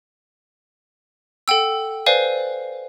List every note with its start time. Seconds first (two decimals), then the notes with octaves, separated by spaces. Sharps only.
1.48 A4 F#5 G5 E6
2.06 B4 C5 D5 F5 G#5